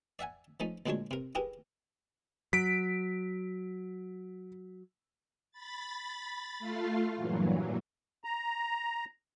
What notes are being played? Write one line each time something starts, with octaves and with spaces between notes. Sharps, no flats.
D5 E5 F#5 G#5
F3 A3 C#4 D#4
D2 A#2 F#3 G#3 D4 C#5
C3 A#4
E4 G4 G#4 A#4 B4
F#3 B6 D7
B5 A6
A3 F4 F5
G2 A#2 E3 F#3
A#5